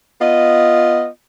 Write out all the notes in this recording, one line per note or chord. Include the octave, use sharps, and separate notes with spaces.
B3 F4 D#5